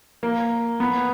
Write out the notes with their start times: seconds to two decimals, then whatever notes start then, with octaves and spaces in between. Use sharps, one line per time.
0.23 A#3
0.80 B3